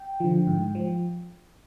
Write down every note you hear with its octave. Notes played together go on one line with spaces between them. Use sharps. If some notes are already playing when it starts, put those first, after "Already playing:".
Already playing: G5
D3 F3
G#2
F3